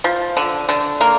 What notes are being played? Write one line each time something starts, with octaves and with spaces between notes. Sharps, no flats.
F3
D3
D3
A#3